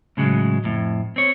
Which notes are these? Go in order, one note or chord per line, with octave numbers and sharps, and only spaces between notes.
A2 C#3 F#3 G#3
F2 A2
C4 C#5